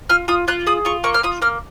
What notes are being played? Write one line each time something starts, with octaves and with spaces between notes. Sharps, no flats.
F4 F6
F4 D#6
F4 F#6
G#4 D#6
F4 C#6
A#3 C#6
F6
F4 D#6
A#3 F6